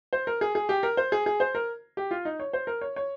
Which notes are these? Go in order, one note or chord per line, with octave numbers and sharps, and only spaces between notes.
C5
A#4
G#4
G#4
G4
A#4
C5
G#4
G#4
C5
A#4
G4
F4
D#4
C#5
C5
A#4
C#5
C#5